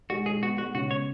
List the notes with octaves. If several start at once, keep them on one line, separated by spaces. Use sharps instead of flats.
G#3 F#4
G#3 G#4
B3 F#4
G#3 F#4
C#3 F#4
B3 C#5